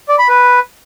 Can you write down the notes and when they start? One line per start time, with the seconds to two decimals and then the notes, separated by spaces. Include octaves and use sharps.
0.09 D5
0.18 B5
0.28 B4